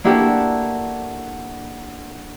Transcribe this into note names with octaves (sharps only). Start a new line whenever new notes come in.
A#3 D4 E4 F#4 G4 A4